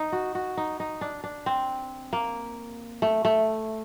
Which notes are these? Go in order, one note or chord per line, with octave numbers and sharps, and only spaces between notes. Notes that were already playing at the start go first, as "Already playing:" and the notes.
Already playing: D#4
F#4
F#4
D#4
D#4
D4
D4
C4
A#3
A3
A3